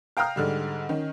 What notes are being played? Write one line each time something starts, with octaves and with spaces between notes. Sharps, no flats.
F5 G5 A#5 D#6 F6
G#2 D3 G3
D#3 C#4